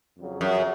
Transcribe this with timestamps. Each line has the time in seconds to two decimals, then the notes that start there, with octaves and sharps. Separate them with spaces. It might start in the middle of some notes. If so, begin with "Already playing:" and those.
0.17 F2 C#3 F#3
0.41 F#2